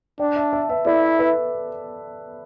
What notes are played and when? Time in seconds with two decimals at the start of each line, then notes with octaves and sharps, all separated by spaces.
0.19 D4 D5 G5
0.36 E5 A5
0.53 E5 A5
0.69 B4 E5
0.86 E4 A4 D5
1.19 B4 E5